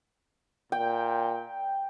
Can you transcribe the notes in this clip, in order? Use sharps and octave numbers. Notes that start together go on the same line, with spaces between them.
A#2 G5